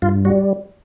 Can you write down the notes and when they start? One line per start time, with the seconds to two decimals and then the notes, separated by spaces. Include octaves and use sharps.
0.02 G2 F4
0.25 G3 F#4